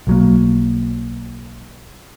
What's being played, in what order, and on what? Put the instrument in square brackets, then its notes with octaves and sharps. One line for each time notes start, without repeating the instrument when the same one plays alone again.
[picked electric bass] B1 F#3 A#3